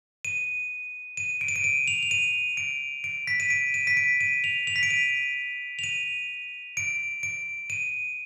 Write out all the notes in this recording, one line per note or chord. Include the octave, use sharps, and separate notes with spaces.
D#7
D#7
D7
D#7
D7
D#7
F7
F7
D#7
D7
D7
B6
D#7
D7
D#7
B6
D7
D#7
F7
F7
B6
D7
D#7
F7
D#7
D7
D7
D#7